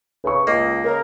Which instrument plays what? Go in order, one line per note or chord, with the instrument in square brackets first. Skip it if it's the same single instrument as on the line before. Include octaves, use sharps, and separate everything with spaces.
[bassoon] C#3 [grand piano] B4 C#6
[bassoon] C#2 [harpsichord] A#3 [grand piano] D#5
[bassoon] C#3 [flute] A#4